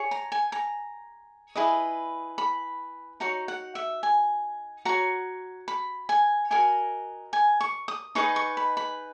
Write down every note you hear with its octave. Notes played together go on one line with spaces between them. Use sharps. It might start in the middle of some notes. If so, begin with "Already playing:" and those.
Already playing: G#4 C#5
A#5
G#5
A#5
E4 G#4 B4 D#5
B5
D#4 F#4 C#5 A#5
F#5
E5
G#5
F#4 C#5 A#5
B5
G#5
F#4 A#4 D#5 G#5
G#5
C#6
D#6
D#4 G#4 B4 D#5 C#6
C#6
B5
B5